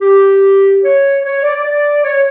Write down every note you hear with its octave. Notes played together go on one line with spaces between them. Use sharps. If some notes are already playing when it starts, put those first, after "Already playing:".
G4
C#5
C#5
D5
D5
C#5